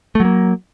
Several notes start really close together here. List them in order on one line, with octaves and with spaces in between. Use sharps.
A3 F#3 A#3